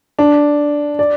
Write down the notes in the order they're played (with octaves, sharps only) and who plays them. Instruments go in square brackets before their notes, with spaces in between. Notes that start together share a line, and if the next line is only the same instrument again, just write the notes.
[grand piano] D4
D5